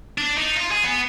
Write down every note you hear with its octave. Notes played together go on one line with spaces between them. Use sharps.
D4
D#4
F4
G#4
B3